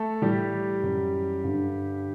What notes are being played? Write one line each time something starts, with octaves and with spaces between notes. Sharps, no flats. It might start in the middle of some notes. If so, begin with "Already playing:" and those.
Already playing: A3 A4
A2 E3 G3 G4
F#2 E3
G2 D3